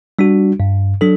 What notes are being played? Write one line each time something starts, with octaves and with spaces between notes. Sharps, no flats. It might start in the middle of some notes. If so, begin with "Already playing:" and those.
G3 D4 F#4
G2
F#3 D4 A4